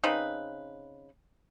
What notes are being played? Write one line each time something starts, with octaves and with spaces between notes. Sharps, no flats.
C#3 C4 D#4 B4